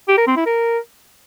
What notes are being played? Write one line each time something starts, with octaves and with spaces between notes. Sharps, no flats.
G4
A#4
C4
E4
A#4